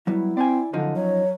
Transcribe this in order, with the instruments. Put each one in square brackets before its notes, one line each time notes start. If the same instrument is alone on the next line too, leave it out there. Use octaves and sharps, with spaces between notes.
[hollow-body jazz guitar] F#3 G3 B3 [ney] E4
[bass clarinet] C4 [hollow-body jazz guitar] D5 G#5
[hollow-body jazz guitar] F#2 F3 D#4 [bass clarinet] D3
[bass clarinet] F#3 [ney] C#5